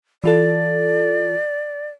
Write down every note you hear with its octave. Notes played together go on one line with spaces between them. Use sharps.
E3 F4 A4 D5